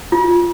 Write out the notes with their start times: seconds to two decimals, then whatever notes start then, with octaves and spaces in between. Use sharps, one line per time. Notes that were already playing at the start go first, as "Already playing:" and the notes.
0.12 F4